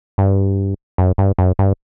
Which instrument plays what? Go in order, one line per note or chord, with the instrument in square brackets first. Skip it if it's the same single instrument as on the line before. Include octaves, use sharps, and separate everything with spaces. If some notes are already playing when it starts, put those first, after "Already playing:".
[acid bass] G2
F#2
G2
F#2
G2